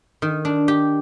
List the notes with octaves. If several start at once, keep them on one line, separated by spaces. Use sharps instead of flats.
D#3
D4
G4